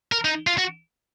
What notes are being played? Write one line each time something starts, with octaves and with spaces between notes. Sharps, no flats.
A#4
D#4
F4
F#4